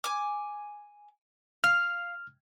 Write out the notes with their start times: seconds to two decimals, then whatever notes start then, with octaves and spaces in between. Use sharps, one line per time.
0.04 G#5 D6
1.64 F5 F6